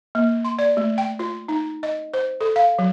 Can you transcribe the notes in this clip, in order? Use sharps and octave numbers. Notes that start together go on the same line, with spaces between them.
A#3
C6
D5
A3
G5
F4
D#4
D#5
C5
A4
F5
F#3